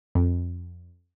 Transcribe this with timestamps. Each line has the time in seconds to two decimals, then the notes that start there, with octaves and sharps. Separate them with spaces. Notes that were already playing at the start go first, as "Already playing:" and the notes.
0.15 F2